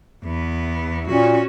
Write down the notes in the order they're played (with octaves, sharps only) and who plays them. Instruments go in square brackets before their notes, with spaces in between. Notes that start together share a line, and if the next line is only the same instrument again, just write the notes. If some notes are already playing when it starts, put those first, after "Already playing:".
[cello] E2 B3
[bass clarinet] A#2 [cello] C#4 F#4